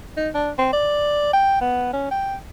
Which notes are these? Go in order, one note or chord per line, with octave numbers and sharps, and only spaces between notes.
D#4
D4
C4
D5
G5
B3
C#4
G5